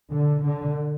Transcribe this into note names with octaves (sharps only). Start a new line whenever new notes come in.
D3
D3